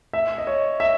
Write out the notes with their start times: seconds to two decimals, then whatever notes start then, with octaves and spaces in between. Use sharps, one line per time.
0.13 E5
0.38 D#5
0.47 C#5
0.80 E5